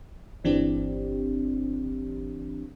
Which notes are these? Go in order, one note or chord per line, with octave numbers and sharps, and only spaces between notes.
G1 E3 C4 D4 G4